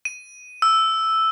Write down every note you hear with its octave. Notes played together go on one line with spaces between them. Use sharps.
D#7
E6